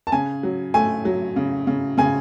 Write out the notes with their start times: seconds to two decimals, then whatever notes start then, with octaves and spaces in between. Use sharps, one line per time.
0.07 A5
0.12 C#3 G#5
0.43 F#3
0.74 A3 G#5
1.05 F#3
1.36 C#3
1.67 C#3
1.98 C#3 G#5